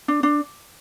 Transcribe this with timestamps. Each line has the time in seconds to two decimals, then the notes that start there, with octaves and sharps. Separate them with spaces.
0.08 D4
0.23 D4